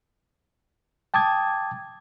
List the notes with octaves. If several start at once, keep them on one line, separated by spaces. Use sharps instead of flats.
G5 A5 D6 D#6 G#6